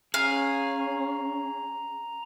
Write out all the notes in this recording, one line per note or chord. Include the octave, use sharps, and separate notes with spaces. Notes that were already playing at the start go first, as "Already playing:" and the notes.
C#4 G#4 F5 A#5